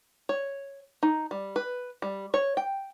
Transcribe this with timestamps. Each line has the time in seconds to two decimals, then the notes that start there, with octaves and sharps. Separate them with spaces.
0.29 C#5
1.03 D#4
1.31 G3
1.56 B4
2.02 G3
2.34 C#5
2.57 G5